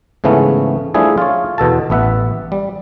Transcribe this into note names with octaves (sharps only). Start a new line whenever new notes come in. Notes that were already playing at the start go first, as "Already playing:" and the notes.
G#2 C#3 E3 A3 B3 C#4
F3 G3 A3 D4 E4 G#4
F4 C#5
E2 B2 A4 A5
A1 B3 E5 F#5
G3